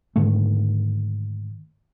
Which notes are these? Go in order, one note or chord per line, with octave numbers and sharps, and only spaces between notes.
G#2 D3 D#3 A3